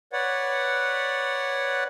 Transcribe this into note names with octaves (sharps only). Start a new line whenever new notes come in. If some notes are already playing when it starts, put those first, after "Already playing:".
B4 C#5 D5 F#5